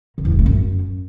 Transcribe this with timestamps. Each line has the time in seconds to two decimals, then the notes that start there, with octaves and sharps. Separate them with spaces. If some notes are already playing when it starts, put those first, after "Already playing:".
0.18 D#3
0.25 E2
0.32 G2
0.39 A3
0.46 F#2